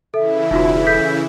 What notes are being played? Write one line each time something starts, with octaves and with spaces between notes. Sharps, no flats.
C#3 E3 E4 A4 E5
E1 D#4 F4 F#4
A4 G6 B6